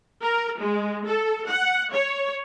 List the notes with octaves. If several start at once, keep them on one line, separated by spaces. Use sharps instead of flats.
A#4
G#3
A4
F#5
C#5